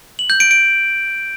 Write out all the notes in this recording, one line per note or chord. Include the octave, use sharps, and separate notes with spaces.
F#7
G6
D7
D7